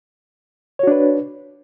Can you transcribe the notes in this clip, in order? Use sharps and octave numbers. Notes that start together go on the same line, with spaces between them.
D4 F#4 B4 C#5